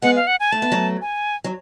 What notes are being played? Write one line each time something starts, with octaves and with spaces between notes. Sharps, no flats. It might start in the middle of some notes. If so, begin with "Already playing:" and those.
G#3 B3 F#5
F5
F#5
G#5
A3 A5
B3
F#3 A3
G#5
F#3